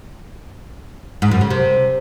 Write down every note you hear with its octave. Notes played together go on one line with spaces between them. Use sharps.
G#2
F#2
C#3
C3